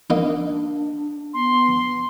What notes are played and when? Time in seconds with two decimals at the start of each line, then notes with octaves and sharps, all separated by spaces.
0.10 A#3 D4 D#4
1.34 B3 C6